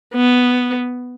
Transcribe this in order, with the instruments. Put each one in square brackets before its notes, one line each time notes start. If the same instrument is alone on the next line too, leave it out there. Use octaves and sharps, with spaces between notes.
[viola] B3